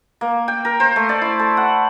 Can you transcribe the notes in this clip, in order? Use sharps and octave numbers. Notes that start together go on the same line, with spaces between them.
A#3
G5
A#4
C5
A3
D5
E4
A4
F#5